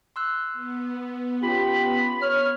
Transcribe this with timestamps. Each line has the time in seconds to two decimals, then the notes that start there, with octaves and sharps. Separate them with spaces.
0.16 C6 E6 F#6
0.53 B3
1.43 C#4 F4 G4 B5
2.22 C#5 B5 F6